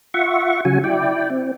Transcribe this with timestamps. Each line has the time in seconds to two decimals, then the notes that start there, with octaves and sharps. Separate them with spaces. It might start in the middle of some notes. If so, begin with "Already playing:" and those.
0.14 F4 E5 F#5 C#6
0.65 C#3 F#3 F#4 G#5
0.84 E4 D5 G5
1.30 C4